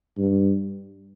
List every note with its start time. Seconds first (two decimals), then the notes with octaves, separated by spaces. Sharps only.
0.18 G2